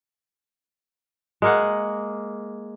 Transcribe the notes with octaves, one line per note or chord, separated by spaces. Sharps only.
G#3 A#3 F#5